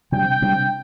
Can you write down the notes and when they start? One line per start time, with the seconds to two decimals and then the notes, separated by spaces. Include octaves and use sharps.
0.12 C3 G3 D4 G5
0.42 C3 G3 D4